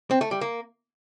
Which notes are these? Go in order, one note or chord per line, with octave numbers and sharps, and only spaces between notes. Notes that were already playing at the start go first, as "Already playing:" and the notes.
C4
A3
G3
A#3